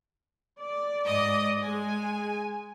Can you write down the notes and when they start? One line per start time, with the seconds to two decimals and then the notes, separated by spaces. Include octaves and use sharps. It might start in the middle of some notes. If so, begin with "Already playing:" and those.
0.59 D5
1.04 G#2 D#5 D#6
1.61 G#3 G#5